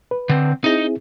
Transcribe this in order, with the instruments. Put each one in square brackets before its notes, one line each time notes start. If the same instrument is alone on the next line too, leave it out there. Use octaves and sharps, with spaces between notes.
[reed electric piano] B4
[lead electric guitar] D3 C4
[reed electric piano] C4 E4 G#4 [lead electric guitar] D#4 D#5